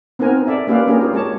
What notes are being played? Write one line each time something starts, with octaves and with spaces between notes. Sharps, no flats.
B3 C4 D#4 A#4 G#5
A4 D5 E5
A#3 C#4 G4 B4 D5 F5
A#3 C#4 D4 G4 G#4 A#4
F4 G4
G#3 C#5 A5